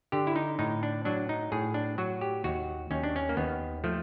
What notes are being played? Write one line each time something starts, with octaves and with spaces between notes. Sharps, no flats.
D3 G4
E4
D#4
A2 D#4
D4
F#3 D4
D#4
A2 G#4
D4
F#3 F#4
G4
D#2 F#4
D#2 C#4
D4
C#4
A#3
D#2 B3
F3 A3